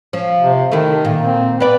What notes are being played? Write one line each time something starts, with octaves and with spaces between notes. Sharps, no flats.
F3 C#4
C3
D#3 A3 E4
A#2
C4
B3 B4 D5